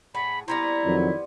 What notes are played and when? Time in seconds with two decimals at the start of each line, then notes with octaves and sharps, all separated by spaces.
0.15 A2 G#4 F#5 B5
0.48 G3 B3 C4 E4 A#5
0.85 F2 D#3 F#3